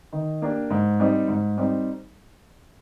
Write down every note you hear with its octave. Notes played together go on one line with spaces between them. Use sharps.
D#3
A#3 D4 G4
G#2
G3 C4 D#4
G#2
G3 C4 D#4